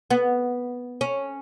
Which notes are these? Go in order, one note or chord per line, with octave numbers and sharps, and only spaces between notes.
B3
C#4